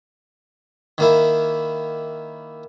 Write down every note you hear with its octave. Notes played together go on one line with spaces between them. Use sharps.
D#3 A#3 E4